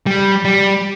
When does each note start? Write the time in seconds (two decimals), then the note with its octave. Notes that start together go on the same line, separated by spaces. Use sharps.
0.07 G3
0.45 G3